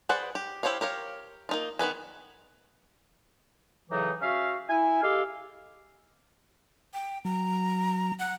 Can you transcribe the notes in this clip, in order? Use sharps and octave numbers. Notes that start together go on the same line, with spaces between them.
G#4 B4 C5 D5 F#5
G4
E4 G4 C5 C#5 F5
G4 A#4 C#5 F5
A#3 D#4 F4
D#3 B3 B4 G#5
A2 C#3 E3 F#3 D#4
C#4 F#4 E5 F5
E4 G#5
G#3 G4 A4 F5
G5
F#3 A#5
F#5